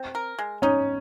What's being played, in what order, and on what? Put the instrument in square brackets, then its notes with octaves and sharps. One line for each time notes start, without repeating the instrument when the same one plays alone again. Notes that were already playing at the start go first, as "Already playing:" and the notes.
Already playing: [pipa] C4
A#4
G#3
[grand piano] C#4 [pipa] D#4